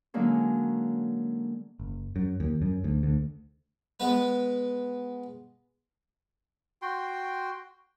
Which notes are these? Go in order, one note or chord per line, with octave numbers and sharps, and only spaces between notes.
D3 F#3 G#3 A#3 C#4
F#1
F#2
D#2
F#2
D2
D2
G#3 B3 B4
F#4 G5 C6